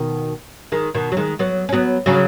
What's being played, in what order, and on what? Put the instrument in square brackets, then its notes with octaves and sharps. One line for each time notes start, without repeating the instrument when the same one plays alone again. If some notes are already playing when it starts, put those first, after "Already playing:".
Already playing: [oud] B2 D#3
D#3 G#3
B2 D#3
F#3
D#3 G#3
F#3 B3
C#4
F#3 B3
C#3 F#3